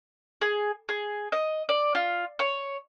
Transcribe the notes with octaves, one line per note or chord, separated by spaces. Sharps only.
G#4
G#4
D#5
D5
F4
C#5